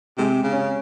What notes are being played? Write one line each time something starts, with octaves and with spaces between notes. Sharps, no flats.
C3 G#3
C#3
C#4